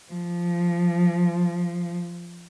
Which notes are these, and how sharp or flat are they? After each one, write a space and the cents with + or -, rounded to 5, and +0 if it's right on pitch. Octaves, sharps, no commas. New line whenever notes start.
F3 -10